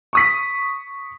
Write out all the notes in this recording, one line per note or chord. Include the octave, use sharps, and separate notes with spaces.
C#6 D#6 B6